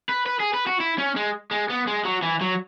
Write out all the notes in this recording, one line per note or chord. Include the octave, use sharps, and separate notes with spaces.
B4
B4
G#4
B4
F#4
E4
C#4
G#3
G#3
B3
G#3
F#3
E3
F#3